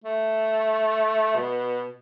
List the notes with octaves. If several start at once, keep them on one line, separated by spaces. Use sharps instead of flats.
A3
B2